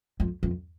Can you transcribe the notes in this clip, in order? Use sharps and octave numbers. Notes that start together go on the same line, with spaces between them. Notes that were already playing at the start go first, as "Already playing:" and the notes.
F2
F2